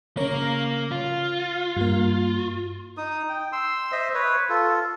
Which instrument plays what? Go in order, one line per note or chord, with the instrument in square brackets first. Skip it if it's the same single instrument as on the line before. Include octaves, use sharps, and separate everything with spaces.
[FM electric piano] C#3 C#5 [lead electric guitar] A#3 A#4
[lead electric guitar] F4
[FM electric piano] G2 A#3
[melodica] D#4 D#6
G5
C6 E6
C5 D#5 E5
B4 C#5
F4 A4